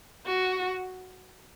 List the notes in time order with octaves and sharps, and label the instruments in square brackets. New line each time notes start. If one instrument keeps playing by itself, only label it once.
[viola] F#4